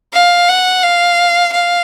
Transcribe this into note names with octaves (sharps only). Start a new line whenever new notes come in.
F5
F#5
F5
F5